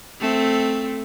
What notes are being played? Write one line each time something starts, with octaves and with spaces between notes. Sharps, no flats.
A3 C4